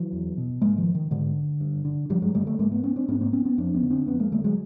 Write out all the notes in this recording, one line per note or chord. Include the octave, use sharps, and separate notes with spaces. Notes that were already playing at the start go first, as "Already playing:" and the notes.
Already playing: E3 F#3
E2
B2
G#2 G#3 A#3
D#3 F3
D#3
G#2 D3
G2
D3
G2 F3 G3
F#3 G#3
D3 G3 A3
G3 A3
G#2 G#3 A#3
A3 B3
B3 C#4
C4 D4
G#2 B3 C#4
A#3 C4
B3 C#4
B3 C#4
F2 C4 D4
B3 C#4
D3
C4 D4
F2 B3 C#4
G#3 A#3
D3 G3 A3
F#3 G#3